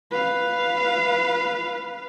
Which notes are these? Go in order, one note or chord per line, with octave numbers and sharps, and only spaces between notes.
B4 F5